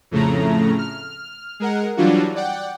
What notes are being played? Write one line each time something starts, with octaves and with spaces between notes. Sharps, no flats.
F2 A2 C#3 A3 A#5
F6
G#3 A#4 F#5
E3 F#3 G3 D4 F4 F#4
D5 F#5 G5